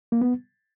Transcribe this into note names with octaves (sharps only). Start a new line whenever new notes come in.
A#3
B3